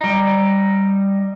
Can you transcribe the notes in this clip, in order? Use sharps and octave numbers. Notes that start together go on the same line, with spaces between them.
G3 D#4